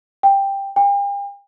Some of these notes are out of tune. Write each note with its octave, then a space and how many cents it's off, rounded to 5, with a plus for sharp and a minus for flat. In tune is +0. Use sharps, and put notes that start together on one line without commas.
G5 +10
G5 +40